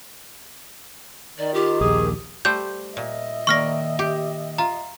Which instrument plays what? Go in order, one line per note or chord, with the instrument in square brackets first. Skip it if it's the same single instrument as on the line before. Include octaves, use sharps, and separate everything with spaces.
[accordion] D#3 [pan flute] D5
[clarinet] F4 [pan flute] G4
[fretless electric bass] A#1 D#2 [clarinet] G#4
[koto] G3 A3 C5 [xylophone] G6
[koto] A#2 [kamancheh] D#5 E5
[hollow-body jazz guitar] D#3 A#3 D5 [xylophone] C#6 F6 A#6
[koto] G4
[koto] F4 [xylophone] A#5